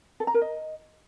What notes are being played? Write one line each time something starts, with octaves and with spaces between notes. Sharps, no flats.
A4
A#5
A#4
D#5